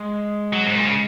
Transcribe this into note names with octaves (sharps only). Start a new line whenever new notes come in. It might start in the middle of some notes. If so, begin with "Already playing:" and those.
Already playing: G#3
F#3
G#2
A#2
C#3